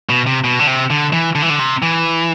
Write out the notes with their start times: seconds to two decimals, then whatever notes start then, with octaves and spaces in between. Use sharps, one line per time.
0.09 B2
0.27 C3
0.44 B2
0.59 D3
0.67 C3
0.90 D3
1.13 E3
1.35 D3
1.42 E3
1.50 D3
1.59 C3
1.82 E3